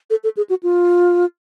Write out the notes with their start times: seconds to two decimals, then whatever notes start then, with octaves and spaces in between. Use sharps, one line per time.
0.10 A4
0.24 A4
0.37 G#4
0.50 F#4
0.63 F4